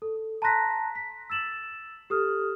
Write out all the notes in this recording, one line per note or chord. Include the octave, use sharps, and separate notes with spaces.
A4
A5 A#5 C6 F#6 A#6 B6
B6
E6 A6 E7 F#7
G4 A4 D#6 F6